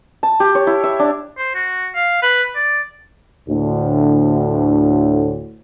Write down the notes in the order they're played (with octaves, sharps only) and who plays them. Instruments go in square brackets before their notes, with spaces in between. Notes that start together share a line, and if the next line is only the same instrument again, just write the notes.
[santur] A5
G4
C#5
E4
E5
D4
[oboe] C5
F#4
F5
B4
D5
[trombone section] D2 A2